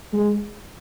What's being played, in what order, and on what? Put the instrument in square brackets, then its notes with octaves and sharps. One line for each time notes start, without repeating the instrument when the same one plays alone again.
[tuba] G#3